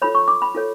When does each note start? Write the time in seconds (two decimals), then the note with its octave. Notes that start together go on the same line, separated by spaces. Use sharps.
0.02 F4 A4 C#5 B5
0.15 C#6
0.28 D6
0.42 B5
0.54 F4 A4 C#5